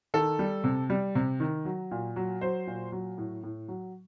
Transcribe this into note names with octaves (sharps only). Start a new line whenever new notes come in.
D#3 A4
G3
C3
G3
C3
D#3
F#3
A#2
F#3
F#3 C5
A#2
F#3
A2
A2
F#3